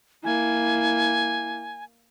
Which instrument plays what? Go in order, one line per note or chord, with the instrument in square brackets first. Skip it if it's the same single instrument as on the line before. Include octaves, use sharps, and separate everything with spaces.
[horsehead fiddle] A#3 E4 [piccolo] G#5